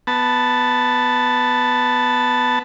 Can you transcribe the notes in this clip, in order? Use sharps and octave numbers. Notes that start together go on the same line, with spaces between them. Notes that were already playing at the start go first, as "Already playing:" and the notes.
B3 A5